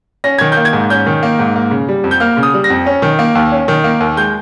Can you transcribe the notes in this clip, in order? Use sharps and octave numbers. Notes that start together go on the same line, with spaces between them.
C#4 A#6
D#3 G#6
G6
A#3
G#6
G#2
C#4 G6
D#3
A#3
G#2
A#3
C#3
G3
F2
G6
A#3 F6
C#3
D#6
G3
A#6
F2
C#4
D#3
A#3
D#2
C#4
D#3
A#3
D#2
G#3 G6